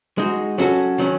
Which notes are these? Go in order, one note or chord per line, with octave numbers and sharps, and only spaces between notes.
G#3 D#4 F#4
F#3 C#4 F#4 A4
D#3 F#3 C#4